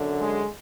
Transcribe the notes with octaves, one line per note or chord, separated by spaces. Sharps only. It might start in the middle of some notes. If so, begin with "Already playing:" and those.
Already playing: F#2 D3
G#3